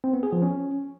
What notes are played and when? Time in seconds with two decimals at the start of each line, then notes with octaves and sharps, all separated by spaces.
0.04 C4
0.13 B3
0.23 G#4
0.33 F3
0.42 C#4